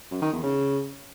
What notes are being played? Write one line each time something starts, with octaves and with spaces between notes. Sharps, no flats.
F#2
D#3
E2
C#3